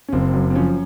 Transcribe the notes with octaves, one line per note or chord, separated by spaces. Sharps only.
C#4
F#1 C4
F#2
C4
F3 C#4